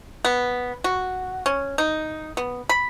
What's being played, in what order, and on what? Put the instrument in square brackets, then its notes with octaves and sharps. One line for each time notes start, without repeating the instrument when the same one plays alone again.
[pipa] B3
F#4
C#4
D#4
B3
B5